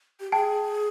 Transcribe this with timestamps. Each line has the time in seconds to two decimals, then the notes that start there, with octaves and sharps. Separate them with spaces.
0.20 G4
0.32 G#4 G5 A5